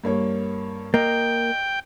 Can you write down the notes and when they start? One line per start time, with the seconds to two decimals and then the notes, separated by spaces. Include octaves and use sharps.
0.04 G2 A#3 C#5
0.94 A#3 D#5 G5